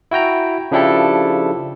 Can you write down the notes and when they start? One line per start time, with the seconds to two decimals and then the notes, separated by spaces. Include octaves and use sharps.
0.11 E4 F#4 G5 A#5
0.72 C#3 F3 D4 E4 G4 A4